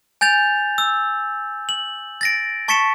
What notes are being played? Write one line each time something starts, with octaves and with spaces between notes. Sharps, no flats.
G#5 G6 A6 F7
E6
F#7
A6 A#6 D7
A5 C#6 A6 B6 C#7 E7